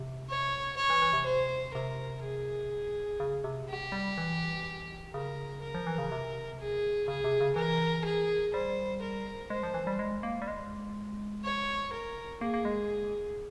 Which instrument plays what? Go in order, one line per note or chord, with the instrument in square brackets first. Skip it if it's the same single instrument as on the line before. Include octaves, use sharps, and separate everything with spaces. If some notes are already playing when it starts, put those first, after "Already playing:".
Already playing: [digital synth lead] C3
[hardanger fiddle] C#5
C#5
[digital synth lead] E3
E3
C3
[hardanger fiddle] C5
[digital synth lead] C3 [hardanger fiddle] A#4
[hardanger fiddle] G#4
[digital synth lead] C#3
C3
[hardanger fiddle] G4
[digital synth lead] G3
E3
[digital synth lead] C#3 [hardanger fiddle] A#4
[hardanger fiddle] A#4
[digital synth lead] F3
E3
C#3
C3
[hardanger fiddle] G#4
[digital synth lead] C#3 [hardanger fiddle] G#4
[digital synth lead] C3
C#3
[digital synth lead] E3 [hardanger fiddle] A#4
[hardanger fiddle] G#4
[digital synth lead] G3 [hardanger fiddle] C5
[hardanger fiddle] A#4
[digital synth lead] G#3 [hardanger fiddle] C5
[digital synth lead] F3
E3
G3
G#3
A#3
G3
G#3
[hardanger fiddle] C#5
A#4
[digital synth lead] A#3 [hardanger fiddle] G#4
[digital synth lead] A#3
G#3